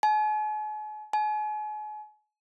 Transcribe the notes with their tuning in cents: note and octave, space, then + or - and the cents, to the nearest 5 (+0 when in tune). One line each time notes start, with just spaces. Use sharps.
G#5 +45
G#5 +40